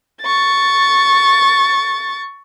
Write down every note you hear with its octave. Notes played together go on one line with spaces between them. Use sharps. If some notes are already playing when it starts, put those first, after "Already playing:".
C#6 A6